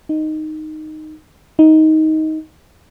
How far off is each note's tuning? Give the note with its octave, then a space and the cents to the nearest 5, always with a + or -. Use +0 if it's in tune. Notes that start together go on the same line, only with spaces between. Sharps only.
D#4 -5
D#4 +15